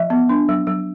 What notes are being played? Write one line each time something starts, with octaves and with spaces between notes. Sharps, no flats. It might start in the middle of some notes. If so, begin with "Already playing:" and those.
Already playing: F3 E5
B3
D4
F#3
F#3